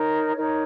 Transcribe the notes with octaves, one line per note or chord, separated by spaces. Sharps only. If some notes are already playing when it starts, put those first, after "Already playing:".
Already playing: D#4 A#4 C#5
D#4 A#4 C#5